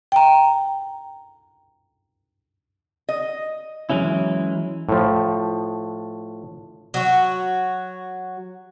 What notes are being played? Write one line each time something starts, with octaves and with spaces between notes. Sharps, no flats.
G5 A#5
D#5
E3 F#3 G#3 C#4 E4
A2 F3
F#3 F#4